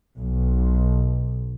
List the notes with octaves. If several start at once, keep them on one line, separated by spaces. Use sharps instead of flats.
B1